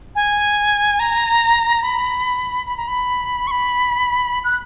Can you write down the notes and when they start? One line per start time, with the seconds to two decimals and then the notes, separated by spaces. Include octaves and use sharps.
0.15 G#5
1.00 A#5
1.83 B5
2.67 B5
2.77 A#5
2.88 B5
3.47 C#6
3.51 B5
4.44 F#6